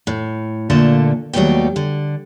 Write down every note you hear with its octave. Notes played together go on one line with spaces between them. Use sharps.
A2
A#2 D3 A3 A#3 A4 A5
D#2 F#3 G3 A3 B3 G5
D3